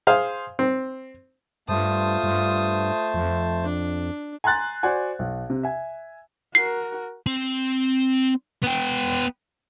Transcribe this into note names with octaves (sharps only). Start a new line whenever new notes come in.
G#4 C5 F5
C4
G2 A3 F4 C5 A5 D#6
G2
F2
D4
G#5 A#5 C6 F#6 A6
F#4 C5 D5 F#5 G#5
B1
C3
E5 G#5
F#4 A#4 C7
C4
B3 G5